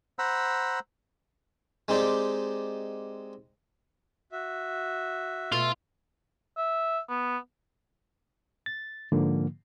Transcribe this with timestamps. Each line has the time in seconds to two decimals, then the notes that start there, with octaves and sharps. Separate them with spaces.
0.19 C5 F#5 A#5 B5 E6
1.88 G#3 C4 D#4 G4 D5
4.32 F#4 E5
5.52 B2 A3 E4 F4
6.57 E5
7.09 B3
8.66 A6
9.12 G#2 D3 F3 A#3